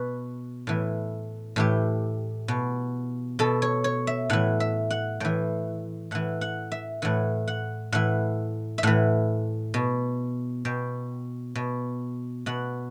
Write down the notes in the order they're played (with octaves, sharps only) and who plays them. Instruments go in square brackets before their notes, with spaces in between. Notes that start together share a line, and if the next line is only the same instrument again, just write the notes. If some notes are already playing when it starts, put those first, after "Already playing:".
Already playing: [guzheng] B2 B4
A2 E3
A2 E3 G4
B2
B2 A4
C#5
C#5
E5
A2 E3 F#5
E5
F#5
A2 E3 G5
A2 E3 F#5
F#5
E5
A2 E3 F#5
F#5
A2 E3 F#5
E5
A2 E3 F#5
B2
B2 G5
B2
B2 F#5